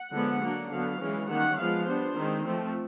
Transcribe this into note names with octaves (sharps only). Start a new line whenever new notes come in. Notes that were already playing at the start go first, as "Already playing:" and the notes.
Already playing: F#5
D3 F3 G#3 B3
F#3 A#3 D4
D3 F#3 B3 F5
E3 G#3 C#4
D#3 G3 A#3 C#4 F#5
F3 G#3 B3 F5
G3 B3 D4 C5
D#3 G#3 C4
F3 A3 C4